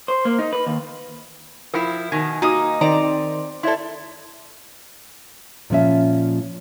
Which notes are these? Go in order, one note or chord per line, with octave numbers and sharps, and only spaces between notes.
C5
A#3
D#4
B4
D#2
F3 E4 A#4 G5 B5
B2 D#3 G#5
A#3 D#4 F#4 A#4 D#5 D#6
D#3 C4 D5 A#5
E4 A4 D5 E5 C6
A#2 F3 C#4 E5